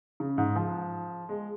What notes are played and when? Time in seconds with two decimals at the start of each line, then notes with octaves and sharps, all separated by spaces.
0.20 C#3
0.38 G#2
0.56 F3
1.29 G#3